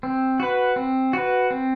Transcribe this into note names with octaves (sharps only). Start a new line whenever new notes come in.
C4
F#4 B4
C4
F#4 B4
C4